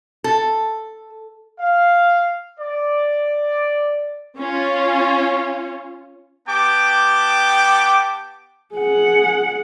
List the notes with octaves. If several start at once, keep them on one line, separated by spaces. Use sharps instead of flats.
A4
F5
D5
C#4 F4
B3 G4 G5 A5 D6
G#4 F#5